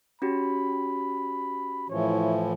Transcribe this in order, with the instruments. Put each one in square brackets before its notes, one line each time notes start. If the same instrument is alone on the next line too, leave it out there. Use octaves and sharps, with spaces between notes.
[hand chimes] C#4 F#4 G4 [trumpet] B5
[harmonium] A2 E3 F3 [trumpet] C#5